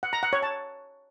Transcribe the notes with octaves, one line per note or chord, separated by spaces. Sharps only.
F#5
A#5
F#5
C#5
A5